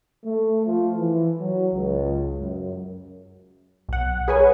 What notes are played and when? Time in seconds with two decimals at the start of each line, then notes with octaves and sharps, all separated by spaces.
0.24 A3
0.66 F3
0.98 E3
1.39 F#3
1.74 C#2
2.38 F#2
3.89 B1 F#5
4.28 G#4 A#4 B4 C#5 F#5 G#5